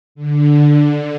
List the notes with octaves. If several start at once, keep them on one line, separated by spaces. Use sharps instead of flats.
D3